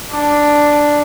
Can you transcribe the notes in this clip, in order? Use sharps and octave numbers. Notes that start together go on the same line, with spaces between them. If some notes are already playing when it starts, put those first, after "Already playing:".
D4